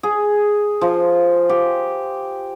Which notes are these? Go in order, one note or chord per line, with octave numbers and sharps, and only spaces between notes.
G#4
F3
G4